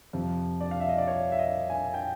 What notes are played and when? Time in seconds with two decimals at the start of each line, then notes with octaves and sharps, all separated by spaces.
0.13 F2 C3 F3
0.61 D5
0.71 F5
0.80 E5
0.89 D#5
0.98 D5
1.08 C#5
1.32 E5
1.39 D#5
1.70 G#5
1.94 G5